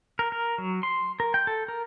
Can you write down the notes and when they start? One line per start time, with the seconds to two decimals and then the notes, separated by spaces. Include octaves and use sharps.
0.19 A#4
0.32 A#4
0.58 F#3
0.83 C6
1.20 A#4
1.34 G5
1.47 A4
1.68 A#4